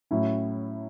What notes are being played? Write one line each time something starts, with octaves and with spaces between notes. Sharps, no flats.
A2 F#3 C#4 E4